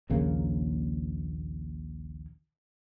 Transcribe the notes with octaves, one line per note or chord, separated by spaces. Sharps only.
A#1 D#2 C#3 A#3